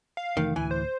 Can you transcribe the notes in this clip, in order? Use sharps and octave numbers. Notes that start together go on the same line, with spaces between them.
F5
F1 D#3 E3 A3
D1 D2 E3 G#5
C5